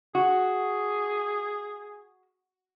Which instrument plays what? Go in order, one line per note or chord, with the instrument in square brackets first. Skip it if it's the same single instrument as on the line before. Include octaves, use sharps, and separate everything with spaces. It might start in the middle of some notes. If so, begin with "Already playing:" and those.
[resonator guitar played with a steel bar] F#4 [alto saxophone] G#4